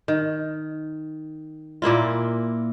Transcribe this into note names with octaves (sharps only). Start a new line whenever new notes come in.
D#3
A#2 A#3 E4 F4